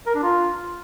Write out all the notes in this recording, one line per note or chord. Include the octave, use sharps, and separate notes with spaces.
A#4
D4
F4